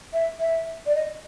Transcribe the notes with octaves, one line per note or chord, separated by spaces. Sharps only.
E5
E5
D5
D#5